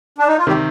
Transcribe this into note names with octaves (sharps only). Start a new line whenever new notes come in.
D4
D#4
F4
C3 D#3 G3 G4